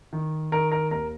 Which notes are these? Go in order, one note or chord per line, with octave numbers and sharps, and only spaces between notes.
D#3
D#3 A#4
A#4
D#2 A#4